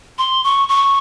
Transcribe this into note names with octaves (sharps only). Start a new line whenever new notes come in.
C6
C#6
C#6